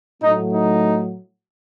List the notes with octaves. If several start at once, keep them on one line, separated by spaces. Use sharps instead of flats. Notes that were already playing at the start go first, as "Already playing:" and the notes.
A2 F#3 A3 D#4
D#4